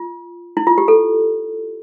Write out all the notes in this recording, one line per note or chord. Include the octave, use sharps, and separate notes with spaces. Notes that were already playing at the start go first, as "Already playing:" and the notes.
Already playing: F4
E4
F4
G4
A4